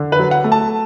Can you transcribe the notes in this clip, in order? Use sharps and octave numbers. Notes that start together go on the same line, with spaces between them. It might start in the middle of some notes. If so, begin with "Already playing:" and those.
Already playing: D3
B4
F#3
F#5
A3
A5